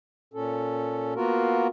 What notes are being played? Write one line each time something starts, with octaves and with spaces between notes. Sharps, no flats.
A#2 C#4 A4
A#3 B3 F4 F#4 A#4